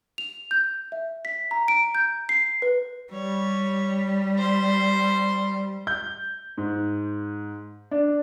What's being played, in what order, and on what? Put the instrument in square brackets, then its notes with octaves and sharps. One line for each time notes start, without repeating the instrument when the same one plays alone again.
[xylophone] F7
G6
E5
B6
A#5
D7
G6
C7
B4
[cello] G3 [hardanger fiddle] C#5
[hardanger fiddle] C5 C6
[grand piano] G6
G#2
D4